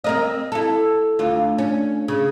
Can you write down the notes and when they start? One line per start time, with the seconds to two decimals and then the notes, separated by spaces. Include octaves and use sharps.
0.04 C4 A#4 D#5
0.52 E4 A4
1.19 D2 F4
1.58 C#4
2.08 C#3